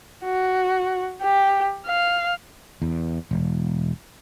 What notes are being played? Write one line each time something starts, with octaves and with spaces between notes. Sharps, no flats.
F#4
G4
F5
E2
E1